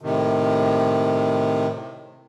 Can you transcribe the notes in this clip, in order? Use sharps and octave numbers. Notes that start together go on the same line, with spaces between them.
A2 C3 D#3